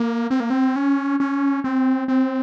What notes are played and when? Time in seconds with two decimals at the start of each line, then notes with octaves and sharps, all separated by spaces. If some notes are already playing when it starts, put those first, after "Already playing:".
Already playing: A#3
0.30 C4
0.40 A#3
0.50 C4
0.76 C#4
1.20 C#4
1.64 C4
2.08 C4